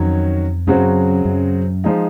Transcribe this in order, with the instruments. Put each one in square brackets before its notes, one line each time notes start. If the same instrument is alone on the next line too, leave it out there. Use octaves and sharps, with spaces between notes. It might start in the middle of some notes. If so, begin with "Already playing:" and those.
Already playing: [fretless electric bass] F2 [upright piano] D#3 F#3 C#4 F#4 C#5
[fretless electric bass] F#2 [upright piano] C#3 F#3 C4 F#4
[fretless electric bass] F#2
[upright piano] F3 G#3 D#4